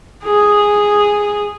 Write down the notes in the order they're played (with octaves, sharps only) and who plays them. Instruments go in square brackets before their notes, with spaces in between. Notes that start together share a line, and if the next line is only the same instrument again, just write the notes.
[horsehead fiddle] G#4